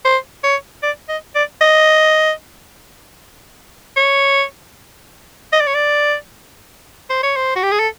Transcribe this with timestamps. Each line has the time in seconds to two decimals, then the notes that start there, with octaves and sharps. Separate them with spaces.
0.05 C5
0.44 C#5
0.83 D5
1.09 D#5
1.35 D5
1.61 D#5
3.96 C#5
5.52 D#5
5.60 D5
5.67 C#5
5.74 D5
7.10 C5
7.23 C#5
7.36 C5
7.56 F#4
7.63 G4
7.72 G#4
7.80 A4